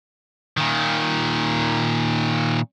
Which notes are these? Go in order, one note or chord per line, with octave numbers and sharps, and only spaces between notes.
A#2 D#3